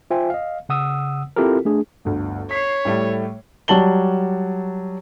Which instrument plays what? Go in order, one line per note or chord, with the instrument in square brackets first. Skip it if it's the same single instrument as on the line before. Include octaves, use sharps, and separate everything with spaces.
[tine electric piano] F4 C5 E5 G5 G#5
D#5 F5
C#3 F#5 D#6 E6
C4 E4 F4 G4 A4 A#4
A3 D4 G#4
[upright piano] G1 D2
[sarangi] C#5 [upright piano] B6 C7
[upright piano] A2 G3 A3
[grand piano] F#3 G3 A5 F#7 G7